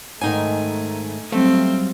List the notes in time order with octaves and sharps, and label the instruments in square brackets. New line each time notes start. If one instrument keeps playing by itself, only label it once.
[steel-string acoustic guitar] G#2 D#3 [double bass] A3 [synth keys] D#4 G#5
[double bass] F#3 G3 [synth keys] A3 [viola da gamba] C4 [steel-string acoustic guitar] F5